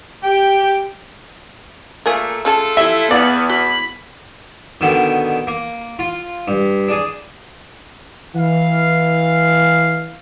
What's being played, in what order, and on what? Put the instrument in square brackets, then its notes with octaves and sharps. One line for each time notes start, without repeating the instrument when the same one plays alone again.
[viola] G4 [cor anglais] G5
[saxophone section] A#2 A3 [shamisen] F4 G#4 A#4
[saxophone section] A3 F4 A4 [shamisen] C#4 G#4 A5
[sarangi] E4 [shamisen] G4 [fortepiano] E5
[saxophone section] E2 [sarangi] B3 [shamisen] F4 B4 [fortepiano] D5
[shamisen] F#4 [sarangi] B5
[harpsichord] B2 D3 D#3
A#3
F4
G2
D4 G#4
[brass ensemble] E3 F5